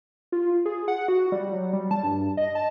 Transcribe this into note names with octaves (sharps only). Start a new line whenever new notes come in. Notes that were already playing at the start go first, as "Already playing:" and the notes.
F4
G#4
F#5
F#4
G3
F#3
G3
A5
G2
D#5
A5